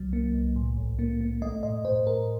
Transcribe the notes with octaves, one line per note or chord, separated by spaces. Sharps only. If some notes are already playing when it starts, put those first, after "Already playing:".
Already playing: C2 F#3
A#3
C2
A2
A#1
A#3
A#3
A3 D#5
A2 D#5
A2 C5
A2 A#4